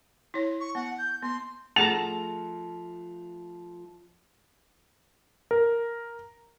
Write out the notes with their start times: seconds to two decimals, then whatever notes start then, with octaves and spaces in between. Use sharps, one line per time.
0.34 E4 C#5
0.60 C#6
0.75 B3 F#5
0.98 G6
1.22 B3 C6
1.76 F3 A3 G#4 F#5 A5 A#5 F7
5.51 A#4